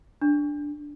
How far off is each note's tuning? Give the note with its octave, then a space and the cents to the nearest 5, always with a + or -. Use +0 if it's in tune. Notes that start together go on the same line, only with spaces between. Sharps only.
D4 +0